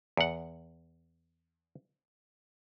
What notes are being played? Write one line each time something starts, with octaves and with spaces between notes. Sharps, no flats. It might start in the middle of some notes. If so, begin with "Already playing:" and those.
E2 F#5